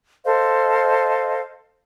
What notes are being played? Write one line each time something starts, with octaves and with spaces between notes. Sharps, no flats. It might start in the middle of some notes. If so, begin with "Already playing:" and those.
A4 C5 D#5 F5